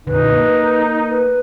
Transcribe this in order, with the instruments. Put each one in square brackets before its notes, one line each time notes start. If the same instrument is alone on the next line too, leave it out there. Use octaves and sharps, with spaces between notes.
[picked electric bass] F#2 A#2 D3 [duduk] D#4 [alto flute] B4
[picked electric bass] A#3
[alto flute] B4